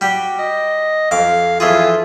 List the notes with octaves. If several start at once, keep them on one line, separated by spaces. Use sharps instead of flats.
G3 F#4 G4
D#5
F2 F5 D6
F2 E3 F4 G#4